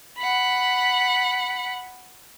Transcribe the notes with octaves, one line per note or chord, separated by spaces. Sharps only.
F#5 B5